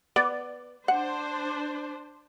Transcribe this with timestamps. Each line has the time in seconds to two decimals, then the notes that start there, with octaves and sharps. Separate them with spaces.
0.16 B3 D5
0.88 D4 C5 F#5